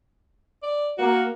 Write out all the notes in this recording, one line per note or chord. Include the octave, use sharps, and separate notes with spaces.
D5
A#3 F#4